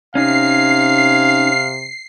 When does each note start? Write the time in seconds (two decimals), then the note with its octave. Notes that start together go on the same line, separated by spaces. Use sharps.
0.15 C3 C#4 D#4 F5 C7